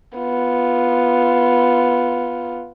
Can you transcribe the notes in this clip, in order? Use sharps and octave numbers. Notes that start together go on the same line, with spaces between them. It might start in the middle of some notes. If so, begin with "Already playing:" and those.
B3 F4